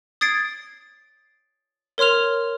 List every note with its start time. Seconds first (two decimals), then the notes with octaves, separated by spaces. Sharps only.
0.21 D#6 G#6 A6 C7 D7
1.98 A#4 C#5 C6 F6 F7